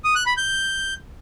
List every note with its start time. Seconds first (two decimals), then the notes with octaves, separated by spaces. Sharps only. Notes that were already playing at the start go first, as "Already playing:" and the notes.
0.04 D#6
0.15 F#6
0.26 B5
0.37 G6